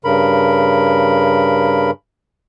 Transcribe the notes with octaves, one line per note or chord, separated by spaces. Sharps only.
G2 C#3 A#4 B5